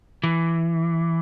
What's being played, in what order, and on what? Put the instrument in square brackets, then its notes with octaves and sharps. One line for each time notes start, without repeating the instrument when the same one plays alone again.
[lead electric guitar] E3